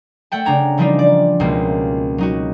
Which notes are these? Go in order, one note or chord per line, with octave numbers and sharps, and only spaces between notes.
A3 F#5 G5 A5
C#3 D4 A#5 G#6
E3 F3 G3 D4 D#4 F4
D5
C#2 B2 A#3 C4
F#3 D#4 F#4